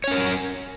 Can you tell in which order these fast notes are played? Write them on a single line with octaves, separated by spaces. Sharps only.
C#5 C#4 A#4